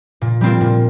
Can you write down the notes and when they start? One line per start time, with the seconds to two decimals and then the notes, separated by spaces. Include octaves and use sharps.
0.21 A#2
0.41 G3 C4 F4 A#4
0.61 A#2